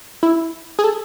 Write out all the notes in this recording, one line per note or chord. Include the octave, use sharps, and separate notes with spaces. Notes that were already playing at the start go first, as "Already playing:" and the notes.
E4
G#4
A4